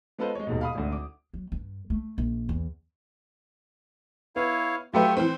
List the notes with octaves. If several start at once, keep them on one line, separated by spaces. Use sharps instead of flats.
G#3 B3 F4 A4 B4 C5
G#3 C#5
D#1 G#2 B2
F5 B5 D#6
G#1 D2
D6
F#3
G2
A3
A#1
E2
B3 E4 C#5 F5
F#3 A3 F4 G4 B4 E5
E3 C4 C5